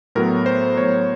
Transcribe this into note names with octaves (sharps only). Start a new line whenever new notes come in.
A2 F#3 B3 A#4
C5
A2 F#3 B3 C#5